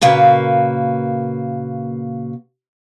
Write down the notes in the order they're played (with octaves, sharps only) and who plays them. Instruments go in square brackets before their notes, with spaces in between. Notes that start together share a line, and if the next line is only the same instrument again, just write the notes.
[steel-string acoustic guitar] A#2 C#3 A#3 F#4 B4